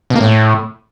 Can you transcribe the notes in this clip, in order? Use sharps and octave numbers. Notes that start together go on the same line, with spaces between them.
B2
A#3
A2